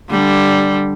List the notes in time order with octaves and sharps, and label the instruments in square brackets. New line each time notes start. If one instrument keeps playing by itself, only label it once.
[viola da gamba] D3 G3